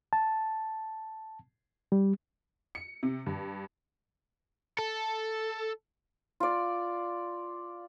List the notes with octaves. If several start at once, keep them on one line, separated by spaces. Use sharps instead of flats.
A5
G3
C#7
C3
G2
A4
F4 D5